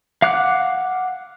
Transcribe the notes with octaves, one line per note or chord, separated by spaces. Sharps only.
F5 F#5 D6 F#6